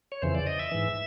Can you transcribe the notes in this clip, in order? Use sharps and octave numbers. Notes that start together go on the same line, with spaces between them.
C#5
F2 C#3 E3 C5
D5
D#5
E5
G#2 E3